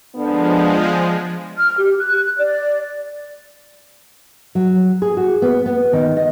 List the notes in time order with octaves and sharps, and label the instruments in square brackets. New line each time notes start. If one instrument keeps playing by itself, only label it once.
[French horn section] D3 B3 D4 [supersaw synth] F3 G#3
[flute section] F6
G4
F#6
D5
[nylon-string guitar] F#3
G#4
F#4
B3
B3
D#3
D#5